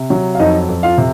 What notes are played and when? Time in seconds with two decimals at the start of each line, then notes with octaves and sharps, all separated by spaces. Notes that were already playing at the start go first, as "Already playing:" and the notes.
Already playing: C3
0.10 F#3
0.35 F5
0.40 F2 D#4 D#5
0.69 F2
0.83 F4 F5
0.98 C3